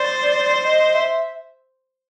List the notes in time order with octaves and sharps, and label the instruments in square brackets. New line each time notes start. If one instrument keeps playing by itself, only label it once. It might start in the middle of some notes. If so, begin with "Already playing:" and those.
Already playing: [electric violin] C5 [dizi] D5
[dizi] D#5
E5